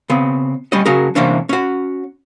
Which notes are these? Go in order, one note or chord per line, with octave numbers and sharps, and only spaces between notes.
C#3 B3 C4
G3 C#4 D#5
C#3 F#3 C#4 G#4 A#4
C3 E3 A#3 C#4 D4
C#4 F#4